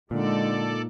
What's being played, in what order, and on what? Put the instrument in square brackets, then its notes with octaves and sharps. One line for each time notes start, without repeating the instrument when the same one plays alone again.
[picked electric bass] A#2 [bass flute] D3 [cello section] G#3 D#4 [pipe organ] A4 D5